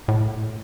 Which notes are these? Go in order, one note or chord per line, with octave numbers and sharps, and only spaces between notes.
A2